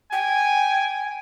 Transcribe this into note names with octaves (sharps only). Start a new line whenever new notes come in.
G5 G#5